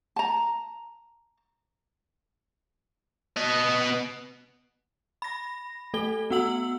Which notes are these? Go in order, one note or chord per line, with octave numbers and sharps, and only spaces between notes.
A5 A#5
B3 D#5
B5 A#6
A3 A4 G7
B3 F#4 F#5 E6 F#7